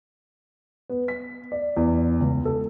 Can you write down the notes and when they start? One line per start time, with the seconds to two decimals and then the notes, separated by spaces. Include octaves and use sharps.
0.90 B3
1.08 B6
1.52 D5
1.77 E2
2.20 C#2
2.45 A4